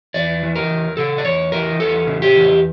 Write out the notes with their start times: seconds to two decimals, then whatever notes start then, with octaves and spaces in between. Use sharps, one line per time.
0.14 E2 D5
0.43 E3
0.56 A#4
0.70 E2
0.97 C#3 A4
1.18 D5
1.25 E2 C#5
1.52 E3 A#4
1.80 E2 A4
2.07 C#3
2.22 G4
2.36 E2